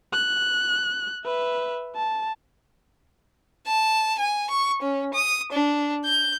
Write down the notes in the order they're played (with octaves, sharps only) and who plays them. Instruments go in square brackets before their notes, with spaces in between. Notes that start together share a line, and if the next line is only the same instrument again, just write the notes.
[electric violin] F#6
B4 E5
A5
[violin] A5
G#5
C#6
C#4
D#6
D4
G6